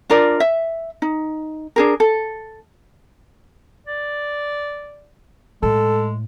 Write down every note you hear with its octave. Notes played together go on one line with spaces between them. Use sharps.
D4 F4 A#4 D5
E5
D#4
D4 G#4 A#4
A4
D5
A2 G#3 A4